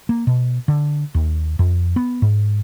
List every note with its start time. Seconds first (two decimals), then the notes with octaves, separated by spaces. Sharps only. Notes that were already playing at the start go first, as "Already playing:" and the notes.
0.09 A#3
0.27 B2
0.68 D3
1.14 D#2
1.59 F2
1.96 B3
2.22 G#2